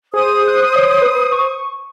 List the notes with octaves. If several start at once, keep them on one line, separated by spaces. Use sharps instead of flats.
G#4 C5 D#6
F#6
C#5
B4
C#6